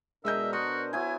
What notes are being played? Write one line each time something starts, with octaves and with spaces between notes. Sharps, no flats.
B2 G#3 D4 A#4 D#5 E5 G6
F#4 C5 D#6
F#3 B3 E4 G#5